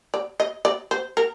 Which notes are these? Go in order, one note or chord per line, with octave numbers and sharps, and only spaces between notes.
D5
D#5
D5
C5
A#4